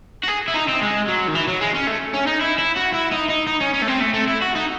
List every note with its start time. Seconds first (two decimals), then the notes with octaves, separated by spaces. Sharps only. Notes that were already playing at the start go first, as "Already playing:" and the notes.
0.24 F#4
0.28 G#4
0.48 E4
0.54 D#4
0.68 C4
0.82 G#3
1.08 F#3
1.28 D#3
1.35 E3
1.48 F#3
1.61 G#3
1.75 C#4
1.87 A3
2.14 C#4
2.27 D#4
2.41 E4
2.59 E4
2.77 F#4
2.94 E4
3.12 D#4
3.30 D#4
3.47 D#4
3.61 C#4
3.74 C#4
3.82 A3
3.88 C4
4.01 A3
4.14 A3
4.28 E4
4.42 F#4
4.55 D#4